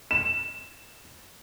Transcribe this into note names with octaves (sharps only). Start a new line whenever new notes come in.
E7